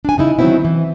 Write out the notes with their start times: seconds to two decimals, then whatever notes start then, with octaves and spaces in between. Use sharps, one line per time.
0.05 D4 G#5
0.18 C#3 D#4 E4
0.39 D#3 F#3 A3 B3 C4 E4
0.65 E3